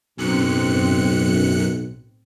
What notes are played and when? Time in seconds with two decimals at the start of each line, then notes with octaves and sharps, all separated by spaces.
0.18 B1 F#2 A2 C4 F#6 C#7